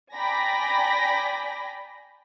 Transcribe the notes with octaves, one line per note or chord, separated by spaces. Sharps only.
D5 G5 G#5 A#5 B5 A#6